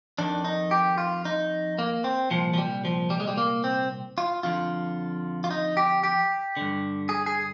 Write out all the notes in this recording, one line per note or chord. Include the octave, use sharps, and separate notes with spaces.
F2 D#3 D4
D#4
G4
F4
D#4
A#3
C4
C2 A#2 F3
F3
G3
F3
G3
G#3
G3
A#3
C4
F4
F2 D3 F4
F4
D#4
G4
G4
G2 D3
G#4
G#4